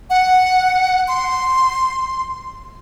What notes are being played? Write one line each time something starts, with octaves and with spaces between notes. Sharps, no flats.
F#5
C6